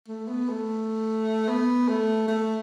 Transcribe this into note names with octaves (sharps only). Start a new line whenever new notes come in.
A3
B3
A3
B3
A3
A3